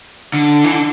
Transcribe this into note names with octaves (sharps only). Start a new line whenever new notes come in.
D3
E3
D3